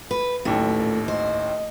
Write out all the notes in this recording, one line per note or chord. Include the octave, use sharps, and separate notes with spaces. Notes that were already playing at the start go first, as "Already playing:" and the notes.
B4
A1 D#2 F#3 A3
A#2
C5 D#5